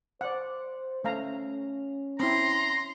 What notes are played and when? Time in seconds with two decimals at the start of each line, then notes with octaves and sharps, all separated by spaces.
0.21 C5 D5 F#5
1.04 A3 C#4 F5 A#5
2.20 C4 E4 A#5 C6